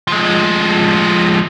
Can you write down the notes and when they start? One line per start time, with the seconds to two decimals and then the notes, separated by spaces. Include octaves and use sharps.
0.07 F3 G#3